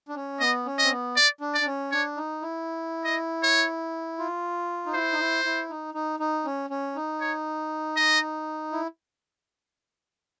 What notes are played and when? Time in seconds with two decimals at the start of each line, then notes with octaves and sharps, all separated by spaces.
0.09 D4
0.15 C#4
0.40 B3 D#5
0.66 C#4
0.79 D#5
0.84 C4
0.90 B3
1.16 D5
1.41 D4
1.54 D5
1.61 D4
1.67 C#4
1.91 D4 C#5
2.17 D#4
2.42 E4
3.05 D#5
3.43 C#5
4.19 F4
4.86 D#4
4.94 E4 C5
5.13 D#4
5.19 E4
5.45 E4
5.70 D#4
5.94 D#4
6.20 D#4
6.45 C#4
6.70 C#4
6.96 D#4
7.21 C#5
7.97 D#5
8.72 E4